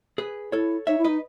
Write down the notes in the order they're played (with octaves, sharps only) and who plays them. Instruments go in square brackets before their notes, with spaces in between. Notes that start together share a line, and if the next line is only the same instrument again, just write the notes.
[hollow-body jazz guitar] G#4 B4
[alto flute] E4 [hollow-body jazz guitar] A4 C#5
[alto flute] D#4 [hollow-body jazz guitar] C#5 E5
[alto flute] E4
[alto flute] D#4 [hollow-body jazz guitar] B4 D#5